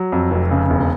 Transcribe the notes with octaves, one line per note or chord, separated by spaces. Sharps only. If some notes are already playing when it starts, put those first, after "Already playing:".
Already playing: F#3
F2
F1
C#3
E1